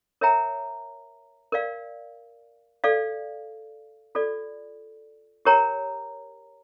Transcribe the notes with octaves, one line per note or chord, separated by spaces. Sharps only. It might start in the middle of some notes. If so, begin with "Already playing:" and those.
A#4 C#5 E5 G5 A#5
A#4 D5 F5
A4 D5 F5
F4 A4 D5
G4 A#4 C#5 G5 A#5